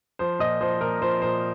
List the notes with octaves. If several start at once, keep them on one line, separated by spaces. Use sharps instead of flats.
F3 C5
A#2 D#5
F3 C5
A#2 A#4
F3 C5
A#2 C5